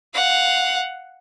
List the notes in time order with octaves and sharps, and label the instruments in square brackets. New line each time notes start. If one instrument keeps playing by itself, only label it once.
[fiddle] F5 F#5